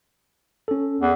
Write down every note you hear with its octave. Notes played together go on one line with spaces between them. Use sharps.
C#4 A4
E2